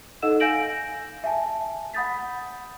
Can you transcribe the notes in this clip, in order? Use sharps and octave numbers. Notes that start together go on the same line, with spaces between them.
D#4 A4 D#5 F#5 E6 E7
F5 G#5 G6 A#6 D7 F#7
E5 G#5 A5
F#5 B5 D#6 G6 A6 B6